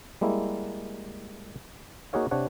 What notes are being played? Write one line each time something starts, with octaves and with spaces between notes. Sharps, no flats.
G3 G#3 A#3 E4
A#3 D#4 F#4 G#4 C#5 F5
C3 D4 C#5 F#5